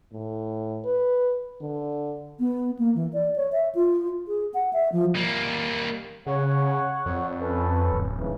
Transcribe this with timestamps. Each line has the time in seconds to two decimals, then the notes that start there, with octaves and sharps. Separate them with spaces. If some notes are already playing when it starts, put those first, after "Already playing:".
0.13 A2
0.85 B4
1.61 D3
2.40 B3
2.79 A#3
2.95 E3
3.13 D5
3.36 C#5
3.52 E5
3.75 F4
4.28 G#4
4.54 F#5
4.73 E5
4.92 F3
5.16 G3 A#3
6.27 C#3 C#5 F#5
7.06 F2
7.41 C#4 A4 B4
7.92 D1
8.18 G#2 C#3 E3